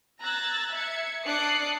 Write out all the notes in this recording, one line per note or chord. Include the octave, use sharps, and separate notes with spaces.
A#5 E6 F#6 G#6 A6
E5 G#6 C#7
D4 D6 D#6 F#6 C7 C#7